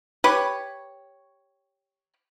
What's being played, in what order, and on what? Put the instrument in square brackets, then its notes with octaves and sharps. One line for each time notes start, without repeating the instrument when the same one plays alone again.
[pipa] G4 B4 C#5